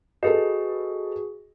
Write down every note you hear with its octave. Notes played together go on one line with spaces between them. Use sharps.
F#4 G#4 A4 B4 D#5